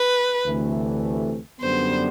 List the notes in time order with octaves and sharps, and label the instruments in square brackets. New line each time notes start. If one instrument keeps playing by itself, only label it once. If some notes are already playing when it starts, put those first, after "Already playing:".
Already playing: [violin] B4
[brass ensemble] D2 C3 E3 A3
[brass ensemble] F#2 D3 G3 B3 [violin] C5